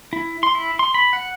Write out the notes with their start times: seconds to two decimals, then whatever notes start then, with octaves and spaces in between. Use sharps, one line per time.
0.13 E4
0.43 C6
0.55 E4
0.79 C6
0.94 B5
1.13 F#5